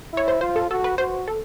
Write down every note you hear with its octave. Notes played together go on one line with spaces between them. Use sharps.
E4 C#5
C5
F4 C5
A4
F#4 A4
B4
F#4 C5
A4